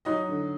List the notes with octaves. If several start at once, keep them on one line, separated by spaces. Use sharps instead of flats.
F#3 D#4 D#5
D3